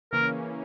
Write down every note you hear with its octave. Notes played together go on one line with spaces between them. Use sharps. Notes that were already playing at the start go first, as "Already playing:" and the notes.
C#3 E3 A#3 C#4 A#4